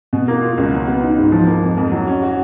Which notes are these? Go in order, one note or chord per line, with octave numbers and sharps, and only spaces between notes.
B2
A#3
F4
C#2
F#3
B3
D#4
G#2
F3
A#3
F2
F2
F#3
C#4
F#4